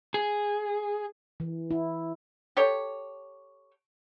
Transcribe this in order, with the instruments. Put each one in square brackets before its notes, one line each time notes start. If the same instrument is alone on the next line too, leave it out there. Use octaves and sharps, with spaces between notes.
[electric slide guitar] G#4
[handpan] E3
E4
[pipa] G4 A4 C#5